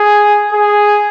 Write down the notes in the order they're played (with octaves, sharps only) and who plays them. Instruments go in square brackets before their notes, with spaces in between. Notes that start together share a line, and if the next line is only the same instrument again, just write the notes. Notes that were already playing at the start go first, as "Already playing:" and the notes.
Already playing: [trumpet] G#4
G#4